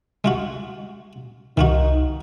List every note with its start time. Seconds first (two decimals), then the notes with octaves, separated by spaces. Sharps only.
0.24 G#3 F4 F#4
1.57 C2 D#3 D#4 F4 F#4